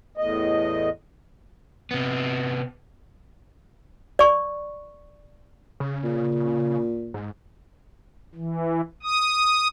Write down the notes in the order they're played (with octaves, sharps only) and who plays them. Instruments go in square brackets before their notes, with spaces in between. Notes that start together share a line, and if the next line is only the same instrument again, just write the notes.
[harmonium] E2 A2 D#5
[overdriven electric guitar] C3 B3
[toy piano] D5 C#6
[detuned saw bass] C#3
[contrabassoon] A#2
[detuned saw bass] G#2
[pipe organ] E3
D#6